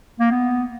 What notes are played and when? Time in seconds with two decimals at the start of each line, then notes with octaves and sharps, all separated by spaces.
0.20 A#3
0.31 B3